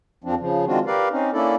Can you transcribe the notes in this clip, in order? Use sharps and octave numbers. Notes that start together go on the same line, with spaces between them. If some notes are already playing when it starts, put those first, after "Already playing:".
F2 F3 C4 D4
C#3 F3
D#3 G#3 C4 D4 F4 F#4
G4 A#4 B4 D5 F5
C4 C#4 D#4
A#3 C#4 D4 E4 A4 D5